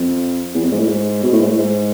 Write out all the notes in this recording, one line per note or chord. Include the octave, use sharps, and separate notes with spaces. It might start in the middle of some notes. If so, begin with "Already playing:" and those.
Already playing: F2
E2
F2
G#2
A2
G#2
B2
A2
G#2
A2
G#2